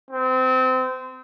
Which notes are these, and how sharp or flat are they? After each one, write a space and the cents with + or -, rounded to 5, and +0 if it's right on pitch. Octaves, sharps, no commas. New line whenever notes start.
C4 -25